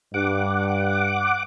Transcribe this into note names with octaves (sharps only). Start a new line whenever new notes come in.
G2 F#5 D6